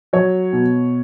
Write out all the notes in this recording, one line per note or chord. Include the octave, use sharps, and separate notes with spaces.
F#3 C#5
B2